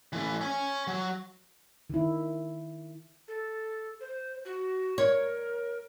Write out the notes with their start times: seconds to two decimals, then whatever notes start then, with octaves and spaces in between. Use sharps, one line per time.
0.13 E3 A3
0.41 C#5 G#5
0.87 F#3
1.90 D#3 E4
3.28 A4
4.00 C5
4.45 F#4
4.98 A#4 C#5